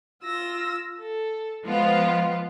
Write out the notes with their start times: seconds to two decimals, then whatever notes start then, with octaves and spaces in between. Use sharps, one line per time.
0.23 F4 E6 A#6
0.99 A4
1.65 F3 G#3 B3 F4 F5